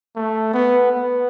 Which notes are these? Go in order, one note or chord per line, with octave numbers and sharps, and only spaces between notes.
A3
B3
B3